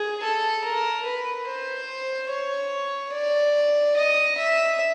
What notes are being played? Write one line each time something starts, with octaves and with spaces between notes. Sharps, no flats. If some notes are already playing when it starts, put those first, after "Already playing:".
Already playing: G#4
A4
A#4
B4
C5
C#5
D5
D#5
E5